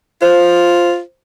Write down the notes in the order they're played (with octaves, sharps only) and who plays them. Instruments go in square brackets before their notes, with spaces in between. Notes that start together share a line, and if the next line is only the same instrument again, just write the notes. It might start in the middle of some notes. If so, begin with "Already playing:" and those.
[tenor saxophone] F4 [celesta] C5